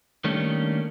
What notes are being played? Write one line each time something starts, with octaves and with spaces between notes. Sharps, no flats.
D#3 G3 A3 A#3 C#4 D4